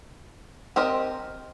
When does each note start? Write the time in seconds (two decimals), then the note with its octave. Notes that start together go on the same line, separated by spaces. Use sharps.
0.76 C4 G4 A#4 D#5